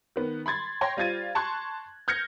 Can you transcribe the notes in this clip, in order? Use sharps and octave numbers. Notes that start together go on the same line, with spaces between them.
D#3 B3
B5 C6 G#6 A6
C#5 G5 C6 G#6 A#6
G3 F4 C5 G#6 A6 D#7
A5 C6 C#6 F#6 G#6
F6 G6 G#6 A#6 C#7